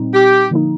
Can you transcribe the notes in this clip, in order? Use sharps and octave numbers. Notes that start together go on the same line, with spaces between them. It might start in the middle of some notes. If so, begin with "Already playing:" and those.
Already playing: A#2 G3 C4 D#4
G4
D3 F3 A#3 D#4